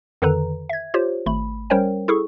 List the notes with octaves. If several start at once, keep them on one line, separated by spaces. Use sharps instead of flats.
F2 D3 D#3 A4 B4 A#5
E5 G#6
F4 G4 C5 C#5
G#1 A3 B5
G3 C#4 A#4 C5 C#5 G5
E4 G#4 A4 C#6